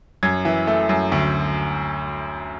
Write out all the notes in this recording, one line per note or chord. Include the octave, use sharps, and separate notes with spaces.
F#2 G#6
E3
A3
F#2
D2